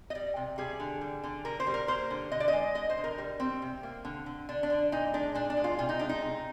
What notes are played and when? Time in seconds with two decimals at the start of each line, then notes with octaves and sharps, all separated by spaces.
0.10 D#5
0.15 G3 D5
0.36 C3
0.58 G3 G#4
0.80 D3
1.01 G3
1.24 D3
1.45 D3 A#4
1.60 C5
1.67 G3
1.74 A#4
1.88 A#3 C5
2.10 D3
2.32 D3 D#5
2.40 D5
2.48 G#3 D#5
2.75 D3 D#5
2.90 C5
2.97 D3
3.04 A#4
3.18 G3
3.40 G3 C4
3.62 C3
3.83 A#3
4.05 D3
4.26 D3
4.49 D3 D4
4.63 D4
4.70 D3
4.92 A#2 D#4
5.14 G#3 D4
5.35 A#2 D4
5.50 D4
5.57 G#3
5.64 F4
5.79 C3 F4
5.89 D#4
5.99 G#3 D4
6.09 D#4
6.22 C3